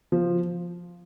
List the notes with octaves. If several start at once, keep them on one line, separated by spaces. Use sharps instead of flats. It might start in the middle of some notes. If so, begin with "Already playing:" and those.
F3